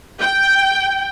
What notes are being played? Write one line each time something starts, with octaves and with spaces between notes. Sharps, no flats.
G5